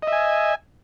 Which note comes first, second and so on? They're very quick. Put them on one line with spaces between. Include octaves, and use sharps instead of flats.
D#5 E5 G#5